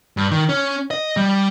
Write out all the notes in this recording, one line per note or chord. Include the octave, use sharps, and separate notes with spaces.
G2
D#3
C#4
D#5
G3